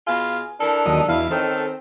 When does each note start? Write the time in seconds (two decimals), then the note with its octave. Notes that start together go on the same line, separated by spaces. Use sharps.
0.07 B2 F4 G#4 F5
0.60 E3 D4 A4 A#4
0.86 D#2 F#3 D#5
1.08 E2 B2 E4 F5
1.31 D#3 C4 C#4 D#4 A4